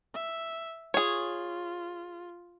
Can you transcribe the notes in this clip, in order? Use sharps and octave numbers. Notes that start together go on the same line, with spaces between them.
E5
F4 G#4 C#5